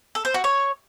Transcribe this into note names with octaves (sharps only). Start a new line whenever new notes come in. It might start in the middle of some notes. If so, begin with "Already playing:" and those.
A4
C5
F#4
C#5